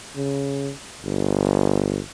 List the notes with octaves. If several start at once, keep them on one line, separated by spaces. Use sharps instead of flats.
C#3
G1